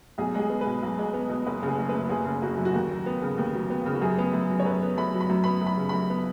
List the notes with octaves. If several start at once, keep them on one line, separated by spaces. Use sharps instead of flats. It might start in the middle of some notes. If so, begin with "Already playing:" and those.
B1 G#4
G#3 G#4
B3
B4
B2
B1
G#3
B3
B2
F#1 B4
C#3
G#4
F#1
B4
F#2
F#1 G#4
C#3
F#1 F#4
F#2
F#4
D#2
F#3
B3
C#3
D#2
F#3
B3
C#3
F#4
F#2 G#4
B3
F#2
F#3
C#5
F#2 B4
B3
F#2 B5
F#3
B5
F#2
B3 B5
F#2 B5
C#3
F#2 B5
B3